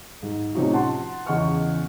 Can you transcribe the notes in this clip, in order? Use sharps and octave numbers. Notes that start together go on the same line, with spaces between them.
G#2
A2 C3 F3 C#4 D#4 F#4
F#5 A5 C6
E2 C#3 D#5 F#5 C#6 F6